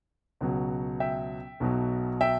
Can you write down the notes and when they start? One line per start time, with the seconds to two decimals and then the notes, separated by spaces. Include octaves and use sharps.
0.41 C#2 B2 F#3
1.00 E5 G5
1.60 B1 B2 F#3
2.21 E5 G5